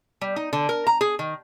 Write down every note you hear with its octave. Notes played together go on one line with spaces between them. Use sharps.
G3
D#4
D3
A#4
A#5
G#4
D#3